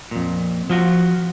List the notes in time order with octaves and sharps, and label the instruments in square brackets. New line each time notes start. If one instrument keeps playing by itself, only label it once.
[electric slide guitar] F2 A#2
F3 F4 F#4